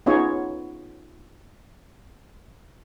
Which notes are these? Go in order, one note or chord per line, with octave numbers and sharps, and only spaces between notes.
B3 C#4 D#4 F4 G#4 C#5